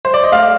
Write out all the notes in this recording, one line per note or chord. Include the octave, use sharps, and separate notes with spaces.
C5
D5
D#5
A3 F5